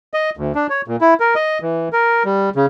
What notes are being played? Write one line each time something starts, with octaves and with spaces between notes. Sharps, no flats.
D#5
D2
D4
C#5
A#2
E4
A#4
D#5
E3
A#4
G3
C#3